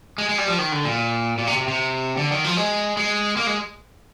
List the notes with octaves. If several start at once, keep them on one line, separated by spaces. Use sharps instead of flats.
G#3
G#3
G3
F3
D#3
D3
A#2
A#2
C3
C3
C3
D3
D#3
F3
G#3
G#3
A#3
G#3